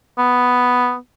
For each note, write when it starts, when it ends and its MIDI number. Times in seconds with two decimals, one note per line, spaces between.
0.18 0.95 59